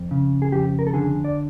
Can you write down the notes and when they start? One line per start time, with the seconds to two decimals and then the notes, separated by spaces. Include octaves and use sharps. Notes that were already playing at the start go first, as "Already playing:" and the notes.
Already playing: F2
0.11 C#3
0.42 G#4
0.52 F2 G4
0.79 A#4
0.87 A4
0.94 D3 G#4
1.25 D5